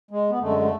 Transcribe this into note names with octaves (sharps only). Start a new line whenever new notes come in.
G#3
B3
F#2 D3 G#3 A3
A3